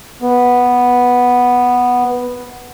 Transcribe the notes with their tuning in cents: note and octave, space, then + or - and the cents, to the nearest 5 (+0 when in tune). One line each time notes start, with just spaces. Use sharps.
B3 -5